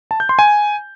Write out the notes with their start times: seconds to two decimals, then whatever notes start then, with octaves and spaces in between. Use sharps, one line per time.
0.11 A5
0.20 G6
0.29 C6
0.39 G#5